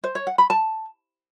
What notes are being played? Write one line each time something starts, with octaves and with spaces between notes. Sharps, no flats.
C5
C#5
F#5
B5
A5